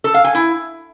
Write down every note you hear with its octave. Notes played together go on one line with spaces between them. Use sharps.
A4
F5
G#5
E4